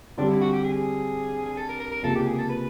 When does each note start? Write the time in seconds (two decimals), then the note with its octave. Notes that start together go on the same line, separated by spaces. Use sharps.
0.18 D3 G3 C4 D4
0.29 E4
0.41 F#4
0.52 G4
0.64 G#4
1.46 G#4
1.57 A4
1.69 A#4
1.80 A#4
1.91 A#4
2.03 C#2 C3 F3 A#3 A4
2.15 G4
2.26 G#4
2.38 A4
2.49 B4